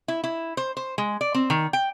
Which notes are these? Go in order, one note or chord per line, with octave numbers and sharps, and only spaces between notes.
E4
E4
C5
C5
G#3
D5
C4
D#3
G5